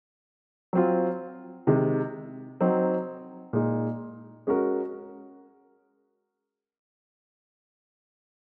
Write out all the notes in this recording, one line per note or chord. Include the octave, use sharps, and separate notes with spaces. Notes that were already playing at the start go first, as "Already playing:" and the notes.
F#3 C4 F4
C3 D#3 G#3
F#3 C4 D#4
A#2 G#3 D#4
G#3 C#4 F#4 A#4